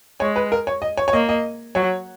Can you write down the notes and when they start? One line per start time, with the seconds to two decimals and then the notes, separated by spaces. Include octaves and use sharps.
0.20 G#3 C#5
0.36 B4
0.52 A#4
0.67 C#5
0.82 D#5
0.97 C#5
1.08 C#5
1.13 A#3 D#5
1.29 D#5
1.75 F#3 C#5